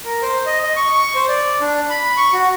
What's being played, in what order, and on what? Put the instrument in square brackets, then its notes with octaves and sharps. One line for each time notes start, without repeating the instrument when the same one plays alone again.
[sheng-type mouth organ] A#4
C5
D#5
D#5
C#6
C#6
C5
D5
D4
B5
C#6
F#4